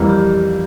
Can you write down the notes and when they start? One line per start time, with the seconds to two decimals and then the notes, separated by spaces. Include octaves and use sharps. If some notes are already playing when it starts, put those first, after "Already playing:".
Already playing: F2 E3 G3 A#3
0.09 G4